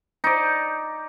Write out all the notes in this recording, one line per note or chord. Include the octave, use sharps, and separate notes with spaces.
D#4 D5